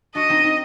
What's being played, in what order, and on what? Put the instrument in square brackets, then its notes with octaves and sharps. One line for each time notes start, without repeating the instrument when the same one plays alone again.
[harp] D4 F#4 [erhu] D#5
[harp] C4 D#4
C4 D#4